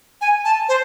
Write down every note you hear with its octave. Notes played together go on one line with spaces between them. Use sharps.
G#5
A5
C5